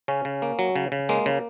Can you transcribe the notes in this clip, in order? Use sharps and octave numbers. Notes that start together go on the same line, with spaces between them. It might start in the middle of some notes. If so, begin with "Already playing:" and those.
C#3 C#4
C#3
A#3
F#3
C#3
C#3
G#3 A#3
C#3